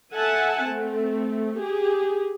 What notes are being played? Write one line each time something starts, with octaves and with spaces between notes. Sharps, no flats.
A4 E5 F#5 G#5 A5
A3 C4
G4 G#4